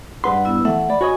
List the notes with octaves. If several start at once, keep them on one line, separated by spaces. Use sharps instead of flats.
G2 B4 F#5 C6
B3 E4 E6
E3 A3 E5 F#5
D5 B5
F#4 C#5 D#5 G#5